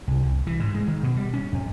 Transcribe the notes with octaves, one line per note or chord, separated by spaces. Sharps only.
C2
C2
E3
G#2
G#3
D#3
B2
G3
C#4
F2